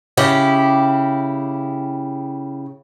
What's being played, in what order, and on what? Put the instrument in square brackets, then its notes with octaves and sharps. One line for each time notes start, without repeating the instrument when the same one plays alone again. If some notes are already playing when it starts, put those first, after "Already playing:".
[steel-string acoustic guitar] C#3 E4 G4